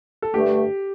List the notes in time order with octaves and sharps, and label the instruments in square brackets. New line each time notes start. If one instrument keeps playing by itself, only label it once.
[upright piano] A4
[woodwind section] G2 D3 A3 [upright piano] G4